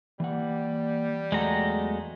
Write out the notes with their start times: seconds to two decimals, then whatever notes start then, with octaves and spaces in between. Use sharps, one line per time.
0.20 E3 G3 A#3 F#5
1.32 E2 F#3 G#3 A3 F#5 A#5